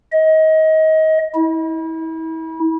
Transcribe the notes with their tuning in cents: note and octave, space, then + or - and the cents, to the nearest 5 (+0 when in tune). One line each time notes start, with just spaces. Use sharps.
D#5 +25
E4 -35